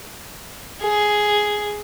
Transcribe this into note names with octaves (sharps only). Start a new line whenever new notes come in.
G#4